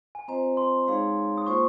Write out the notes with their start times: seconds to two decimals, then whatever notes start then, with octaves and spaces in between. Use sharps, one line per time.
0.15 G#5
0.28 C4 F4 C5 D#5 A#5
0.57 C6
0.87 G#3 D#4 G#4 C#5 F5
1.38 D#6
1.47 A#3 F4 C5 C#6